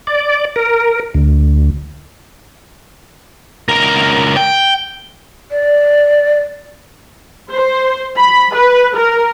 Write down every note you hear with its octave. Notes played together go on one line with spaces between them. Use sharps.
D5
A#4
D2
C#2 A#4
G5
D5
C5
B5
B4
A#4